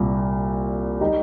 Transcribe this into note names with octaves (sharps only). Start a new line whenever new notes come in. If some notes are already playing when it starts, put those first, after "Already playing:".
Already playing: C2 A#2
G3 D#4 G4